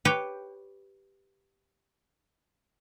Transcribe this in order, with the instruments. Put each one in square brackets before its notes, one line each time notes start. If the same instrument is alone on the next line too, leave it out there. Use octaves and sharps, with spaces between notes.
[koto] G4 B4 C#5 G5